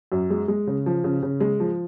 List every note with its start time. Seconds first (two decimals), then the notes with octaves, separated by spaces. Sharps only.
0.12 F#2
0.30 G#3
0.48 G#3
0.67 C#3
0.86 F3
1.04 C#3
1.23 C#3
1.40 G#3
1.60 F3